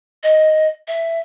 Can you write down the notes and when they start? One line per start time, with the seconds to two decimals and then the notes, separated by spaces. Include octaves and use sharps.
0.23 D#5
0.88 E5